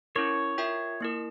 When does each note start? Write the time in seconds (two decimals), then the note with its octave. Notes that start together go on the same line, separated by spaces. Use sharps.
0.16 C#4 E4 A#4 C#5
0.58 F4 A#4 E5 G5
1.01 A#3 E4 A#4